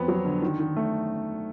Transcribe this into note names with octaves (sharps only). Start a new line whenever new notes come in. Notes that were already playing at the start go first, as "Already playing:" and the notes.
Already playing: F2 B3
F#3
D3
D#3
D#3
A3